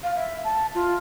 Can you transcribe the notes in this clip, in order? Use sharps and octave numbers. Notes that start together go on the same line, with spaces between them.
F5
E5
A5
F4